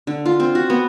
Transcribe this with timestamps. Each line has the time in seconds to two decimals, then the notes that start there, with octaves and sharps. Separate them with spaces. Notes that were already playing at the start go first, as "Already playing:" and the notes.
0.07 D3
0.25 F4
0.40 C4
0.55 F#4
0.70 B3